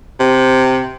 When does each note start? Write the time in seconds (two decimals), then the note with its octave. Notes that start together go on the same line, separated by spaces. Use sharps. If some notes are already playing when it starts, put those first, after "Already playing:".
0.20 C3